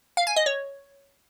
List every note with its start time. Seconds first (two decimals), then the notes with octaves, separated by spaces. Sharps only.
0.17 F5
0.27 G#5
0.36 D#5
0.46 C#5